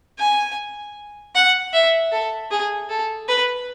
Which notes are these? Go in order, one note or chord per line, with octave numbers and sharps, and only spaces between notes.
G#5
F#5
E5
A4
G#4
A4
B4